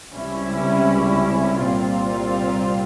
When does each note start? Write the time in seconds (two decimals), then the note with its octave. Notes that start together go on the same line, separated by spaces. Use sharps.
0.12 C#2 C3 G3 C#4 E4
1.62 C2 A#2 G3 C4 F4